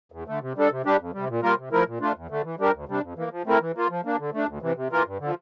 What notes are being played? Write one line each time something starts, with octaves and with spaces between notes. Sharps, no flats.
E2
D3 A3
C3
G3 D4 A4
C3
G3 D4 G4
F2
C3 G3
A#2
G3 A#3 F4 A#4
C3
F3 A3 E4 A#4
A#2
A3 D4 F4
E2
D3 A3
E3
G3 D4 G4 A#4
D2
C3 G3 D4
F2
E3 A#3
F3
A3 C4 E4 A#4
E3
A#3 F4
F3
A#3 D4
D3
A3 D4
D2
C3 E3
C3
E3 A#3 F4 A#4
G2
D3 F3